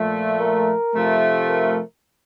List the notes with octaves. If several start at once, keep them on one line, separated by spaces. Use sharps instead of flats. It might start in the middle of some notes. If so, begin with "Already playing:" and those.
Already playing: A#2 F3 A3
A#4
C3 F3 A3
A#4